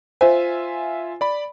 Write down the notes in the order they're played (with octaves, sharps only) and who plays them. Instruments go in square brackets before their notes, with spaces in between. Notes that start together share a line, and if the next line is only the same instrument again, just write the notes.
[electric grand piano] F4 E5 G#5 [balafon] C5
[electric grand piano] D5 B5